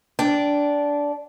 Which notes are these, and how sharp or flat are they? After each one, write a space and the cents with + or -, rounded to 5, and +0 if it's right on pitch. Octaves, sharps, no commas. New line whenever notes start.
D4 -15 G5 +0